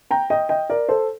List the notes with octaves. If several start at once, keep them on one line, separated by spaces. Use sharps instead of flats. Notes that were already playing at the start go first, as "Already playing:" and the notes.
G5 A#5
D#5 G5
D#5 G5
A#4 D5
A4 C5